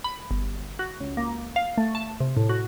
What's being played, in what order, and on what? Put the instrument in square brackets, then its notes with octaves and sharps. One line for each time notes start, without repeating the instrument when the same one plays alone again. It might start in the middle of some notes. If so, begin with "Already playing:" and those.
[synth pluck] B5
G1
F#4
C#2
A#3
F5
A3
A5
C3
A2
F#4